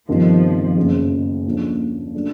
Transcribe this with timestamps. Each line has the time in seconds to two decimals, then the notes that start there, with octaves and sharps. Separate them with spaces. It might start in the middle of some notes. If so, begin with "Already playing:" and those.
0.09 G1 F2 C3 D#3 F3
0.77 F#1 F#2 C#3
1.46 D#2 D3 F3 G#3 C#4
2.14 C#3 F#3 A3 D4